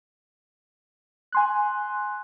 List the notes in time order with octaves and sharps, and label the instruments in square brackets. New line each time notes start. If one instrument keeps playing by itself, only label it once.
[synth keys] G#5 C6 F#6